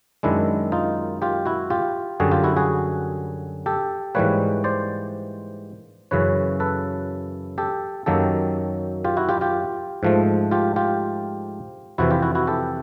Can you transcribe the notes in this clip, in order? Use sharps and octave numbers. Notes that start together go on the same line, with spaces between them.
F#2 D#3 G#3 D4 E4
D#4 F4
F4 G4
E4 F#4
F4 G4
F#2 D3 G3 F#4 G#4
F4 G4
E4 F#4
F#4 G#4
G4 A4
G#2 E3 G3 A#3 B4 C#5
C5 D5
F#2 C#3 E3 B4 C#5
A4 B4
G4 A4
F#2 D#3 F#3 A#3 G4 A4
F4 G4
E4 F#4
F4 G4
F4 G4
G#2 F3 A3
F4 G4
F4 G4
F2 C3 E3 E4 F#4
F4 G4
E4 F#4
E4 F#4
G4 A4